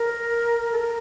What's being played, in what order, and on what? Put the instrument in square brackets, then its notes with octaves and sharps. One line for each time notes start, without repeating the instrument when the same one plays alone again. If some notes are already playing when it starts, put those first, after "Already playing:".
Already playing: [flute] A#4
A4
A#4